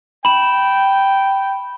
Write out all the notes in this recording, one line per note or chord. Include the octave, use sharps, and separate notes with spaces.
G5 B5 E7